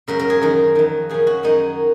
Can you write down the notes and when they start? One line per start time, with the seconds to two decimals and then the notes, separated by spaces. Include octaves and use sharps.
0.08 F#2 C#3 A#4
0.19 A#4
0.30 G#4
0.42 F#2 D#3 A#4
0.75 F2 D#3
1.09 F#2 C#3 G#4
1.27 F#4
1.43 F#2 D#3 D#4